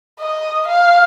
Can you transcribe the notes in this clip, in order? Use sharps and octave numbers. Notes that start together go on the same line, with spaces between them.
D#5
F5